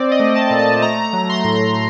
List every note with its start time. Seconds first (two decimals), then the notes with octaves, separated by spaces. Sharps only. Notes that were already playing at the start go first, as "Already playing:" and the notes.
Already playing: C4 D5
0.12 D#5
0.20 A3
0.35 A5
0.51 A#2
0.59 A5
0.82 A3 A#5
1.05 A#5
1.13 F#3
1.30 C6
1.44 A2
1.53 C6